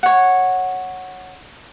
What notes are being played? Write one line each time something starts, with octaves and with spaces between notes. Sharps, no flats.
C#5 F#5